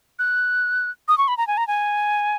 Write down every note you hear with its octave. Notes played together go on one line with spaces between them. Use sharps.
F#6
D#6
C#6
B5
A#5
G#5
A#5
G#5